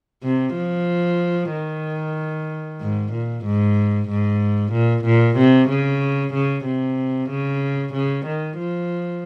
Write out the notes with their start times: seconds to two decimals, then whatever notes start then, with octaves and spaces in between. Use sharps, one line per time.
0.24 C3
0.56 F3
1.52 D#3
2.81 G#2
3.13 A#2
3.45 G#2
4.09 G#2
4.73 A#2
5.05 A#2
5.37 C3
5.69 C#3
6.34 C#3
6.65 C3
7.30 C#3
7.94 C#3
8.26 D#3
8.58 F3